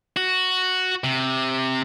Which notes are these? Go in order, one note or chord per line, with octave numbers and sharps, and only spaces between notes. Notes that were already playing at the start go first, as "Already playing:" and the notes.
F#4
C3